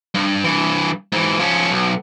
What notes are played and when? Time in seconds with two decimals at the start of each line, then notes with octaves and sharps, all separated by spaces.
0.14 G2
0.44 G2 E3
1.12 G#2 E3
1.39 F3 C#4
1.71 B1